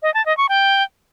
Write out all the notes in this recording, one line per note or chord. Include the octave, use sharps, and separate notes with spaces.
D#5
A5
D#5
C#6
G5